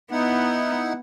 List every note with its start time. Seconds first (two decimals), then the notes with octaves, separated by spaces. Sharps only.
0.11 B3 D#4 E4 F#5